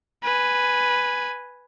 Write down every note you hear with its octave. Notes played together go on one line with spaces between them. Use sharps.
B4 G#5